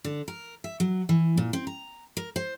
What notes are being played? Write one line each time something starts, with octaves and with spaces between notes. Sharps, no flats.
D3
A#4
E5
F#3
E3
A#2
C4
A#5
A#4
C5